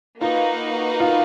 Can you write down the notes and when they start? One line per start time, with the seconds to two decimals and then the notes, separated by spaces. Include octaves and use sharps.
0.21 A#3 D#4 F4 F#4 B4 F5
1.00 F4